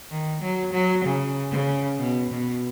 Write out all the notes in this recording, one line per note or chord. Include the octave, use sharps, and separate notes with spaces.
D#3
F#3
F#3
C#3
C#3
B2
B2